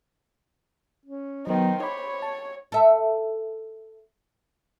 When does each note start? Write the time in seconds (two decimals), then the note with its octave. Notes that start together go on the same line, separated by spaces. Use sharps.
1.06 C#4
1.47 D#3 F#3 B3 C5
1.83 C#5 B5 D6
2.22 A5
2.72 A4 E5